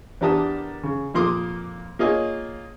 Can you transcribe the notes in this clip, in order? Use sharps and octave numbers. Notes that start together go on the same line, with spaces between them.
E2 D4 G4 A#4 A5 D#6
C#3
F2 A#2 A#3 C6 D6 D#6
A#3 F4 G#4 C#5 D#5 G#5